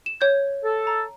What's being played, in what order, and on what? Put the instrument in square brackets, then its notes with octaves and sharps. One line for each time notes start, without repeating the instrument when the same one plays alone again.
[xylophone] E7
C#5 G6 G#6
[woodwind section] A4
[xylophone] A#5